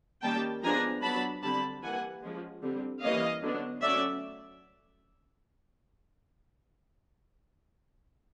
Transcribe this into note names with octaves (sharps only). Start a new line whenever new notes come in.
D#3 G3 A#3 C#4 G5 A5
F3 G#3 B3 D4 G#5 A#5
F#3 B3 D4 A5 B5
D3 G3 C4 A5 B5
E3 G3 A#3 F#5 G#5
F3 G#3 C#4
D3 G3 C4
E3 G3 A#3 C#4 D#5 F5
D3 F#3 B3 D4
F#3 A3 C#4 D5 E5